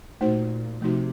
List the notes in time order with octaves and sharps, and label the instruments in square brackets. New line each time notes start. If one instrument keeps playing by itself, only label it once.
[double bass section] A#2 [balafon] A3 D#4 F#4 C5
[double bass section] C3 [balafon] F3 A3 D#4 F#4